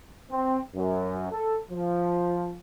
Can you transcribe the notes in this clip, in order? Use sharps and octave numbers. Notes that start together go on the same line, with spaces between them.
C4
F#2
A4
F3